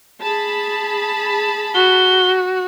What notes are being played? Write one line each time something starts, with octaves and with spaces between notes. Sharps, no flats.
G#4 A5 B5
F#4 G7